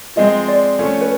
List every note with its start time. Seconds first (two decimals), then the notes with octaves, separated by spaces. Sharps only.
0.16 F3 G#3 C4 D#5
0.48 D5
0.79 F3 A3 C#4
1.01 B4